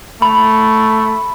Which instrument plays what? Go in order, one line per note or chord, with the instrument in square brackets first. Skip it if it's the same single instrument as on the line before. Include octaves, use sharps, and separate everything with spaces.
[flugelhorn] A3 [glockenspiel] B5